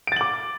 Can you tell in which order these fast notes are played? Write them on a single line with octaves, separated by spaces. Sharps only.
D7 A6 F#7 D6